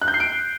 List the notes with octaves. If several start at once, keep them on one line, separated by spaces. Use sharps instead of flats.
F#6
G6
C7
D7